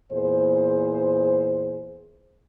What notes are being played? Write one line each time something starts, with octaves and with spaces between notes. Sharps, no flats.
E2 A#2 G#4 C5